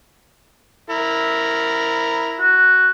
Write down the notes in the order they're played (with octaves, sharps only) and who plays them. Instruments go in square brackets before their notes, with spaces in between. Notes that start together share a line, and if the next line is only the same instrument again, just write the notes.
[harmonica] E4 A#4
[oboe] F#4